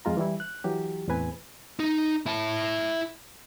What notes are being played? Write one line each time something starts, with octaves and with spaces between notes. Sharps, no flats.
F2 G#3 F4 A#5
E3 G3 E4
F#6
E3 F#3 G4
E2 A2 C4 B4 G#5
D#4
E4 A5